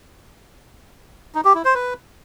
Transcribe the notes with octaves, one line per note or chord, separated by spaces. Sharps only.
D#4
G4
E4
C5
B4